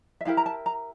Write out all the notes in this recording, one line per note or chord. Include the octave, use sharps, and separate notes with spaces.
E5
E4 G4 A#4 F5
A#5
A5
A#5